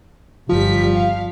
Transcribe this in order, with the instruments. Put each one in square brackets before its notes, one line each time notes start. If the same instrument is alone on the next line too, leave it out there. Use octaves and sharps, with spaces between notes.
[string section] G1 G3 B6 [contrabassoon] F3
[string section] F5